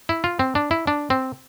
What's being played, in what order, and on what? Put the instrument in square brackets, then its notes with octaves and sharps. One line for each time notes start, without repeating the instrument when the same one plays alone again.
[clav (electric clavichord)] E4
F4
C4
D4
E4
D4
C4